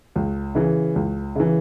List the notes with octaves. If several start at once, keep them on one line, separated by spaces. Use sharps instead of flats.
C#2
C#3 E3
C#2
C#3 E3